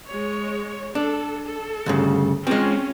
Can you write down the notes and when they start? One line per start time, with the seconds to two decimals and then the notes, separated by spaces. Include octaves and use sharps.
0.10 G#3 C#5
0.95 D4 A4
1.48 A4
1.86 D2 G2 C#3
2.47 G#3 C4 C#4 F4